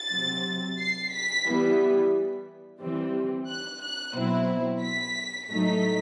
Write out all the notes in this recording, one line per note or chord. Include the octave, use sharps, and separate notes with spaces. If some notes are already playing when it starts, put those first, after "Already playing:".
Already playing: A6
C3 F#3 C4
C7
B6
E3 G3 B3 E4
E3 G3 C4
F#6
F#6
B2 F#3 C4 E4
B6
A2 F#3 A3 D#4 B6